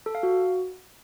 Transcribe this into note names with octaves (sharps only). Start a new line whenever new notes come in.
A4
F5
F#4